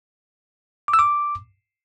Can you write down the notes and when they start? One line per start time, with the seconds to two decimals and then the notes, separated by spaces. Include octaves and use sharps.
0.88 D6
0.94 E6
0.99 D6